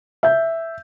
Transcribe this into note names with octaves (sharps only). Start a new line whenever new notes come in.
E5 G6